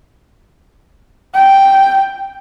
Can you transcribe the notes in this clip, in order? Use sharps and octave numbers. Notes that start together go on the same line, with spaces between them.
G5